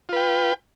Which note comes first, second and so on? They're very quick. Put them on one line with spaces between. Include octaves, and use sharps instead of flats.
F4 B4 G5